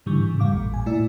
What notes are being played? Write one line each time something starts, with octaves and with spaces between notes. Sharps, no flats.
G#2 D3 E3 G3 C#6
G#2 C#3
F2 G3 F5 D6
A1 A#2
G#5
A#2 A3 E4 D5 E6